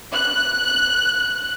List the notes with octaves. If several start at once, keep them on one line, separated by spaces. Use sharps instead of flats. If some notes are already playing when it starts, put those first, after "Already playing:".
F#6